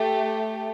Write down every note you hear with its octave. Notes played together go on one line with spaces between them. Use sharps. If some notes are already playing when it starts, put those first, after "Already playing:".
Already playing: A3 G4